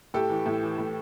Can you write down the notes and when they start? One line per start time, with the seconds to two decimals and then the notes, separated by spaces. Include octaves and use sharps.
0.14 A2 G4 A4
0.30 E3
0.46 A2
0.62 E3
0.78 A2